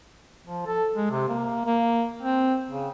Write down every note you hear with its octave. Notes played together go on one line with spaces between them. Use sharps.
F3
A4
G#3
C3
A#3
A#3
C4
C#3